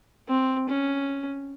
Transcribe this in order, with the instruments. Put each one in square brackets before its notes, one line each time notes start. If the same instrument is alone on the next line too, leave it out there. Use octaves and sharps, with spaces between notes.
[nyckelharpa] C4
C#4